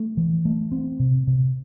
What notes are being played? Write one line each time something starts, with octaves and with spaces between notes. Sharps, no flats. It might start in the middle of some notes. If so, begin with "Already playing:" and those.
Already playing: A3
E3
A3
C4
C3
C3